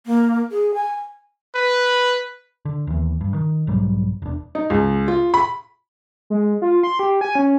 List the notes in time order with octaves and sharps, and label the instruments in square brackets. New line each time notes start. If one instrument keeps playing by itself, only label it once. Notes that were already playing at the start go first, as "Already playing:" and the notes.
[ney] A#3
G#4
G#5
[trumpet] B4
[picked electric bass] D3
D#2 E3
G2
D#3
B1 G#2 F#3 G3
E1 D4
[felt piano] D#4
C#2
F4
B5
[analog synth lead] G#3
F4
C6
G4
G#5
C#4